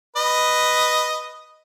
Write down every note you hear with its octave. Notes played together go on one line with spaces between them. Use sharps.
B4 D#5